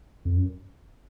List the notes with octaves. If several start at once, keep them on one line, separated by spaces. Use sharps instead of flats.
F2
F#2